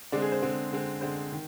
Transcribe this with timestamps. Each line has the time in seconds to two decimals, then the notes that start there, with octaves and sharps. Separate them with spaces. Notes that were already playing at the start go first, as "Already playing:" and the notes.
0.12 D3 G#3 C4 D5
0.22 G#4
0.32 C5
0.42 D3 G#3 C4
0.72 D3 G#3 C4
1.01 D3 G#3 C4 C5
1.32 D#3